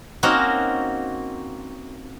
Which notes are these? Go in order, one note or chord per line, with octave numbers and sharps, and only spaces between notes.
A#3 C4 C#4 D#4 F#4 A#4